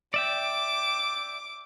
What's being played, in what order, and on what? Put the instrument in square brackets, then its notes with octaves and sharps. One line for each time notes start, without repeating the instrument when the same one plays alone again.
[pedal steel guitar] D5 E5 G5 [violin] D6